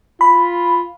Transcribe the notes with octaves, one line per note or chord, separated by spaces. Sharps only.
F4 B5